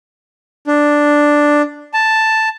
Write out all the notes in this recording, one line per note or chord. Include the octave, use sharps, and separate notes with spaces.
D4
A5